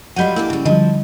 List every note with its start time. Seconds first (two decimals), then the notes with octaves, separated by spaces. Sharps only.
0.16 F#3 G3 F4 D#5 F#5 B5 G6 D#7
0.36 A#3 D4 E4 G4
0.50 C#3 G3
0.66 D3 F3 G3 D#5